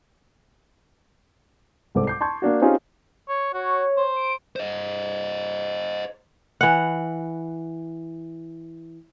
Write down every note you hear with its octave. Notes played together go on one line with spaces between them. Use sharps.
C2 G#2 A4 C5 D6
D6 G6 C7
A5 C6 C#6 G6 G#6
A#3 D4 F#4
C4 C#4 D#4 F4 G4 G#4
C#5
F#4 C#5
C5
D7
C5 D#5
E3 F#5